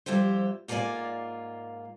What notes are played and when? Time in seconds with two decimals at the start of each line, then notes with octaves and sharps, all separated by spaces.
0.06 F2 G3 E4 G4 C5
0.68 G#2 A#3 F4 B4 D5 G#5